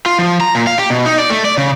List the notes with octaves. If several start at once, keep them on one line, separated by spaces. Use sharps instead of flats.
F4
F3
A#5
A#2
F5
G4
B2
D#4
D5
A3
D5
C#3